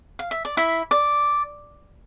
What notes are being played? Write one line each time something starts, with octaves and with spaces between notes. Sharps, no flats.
F5
E5
D5
E4 E5
D5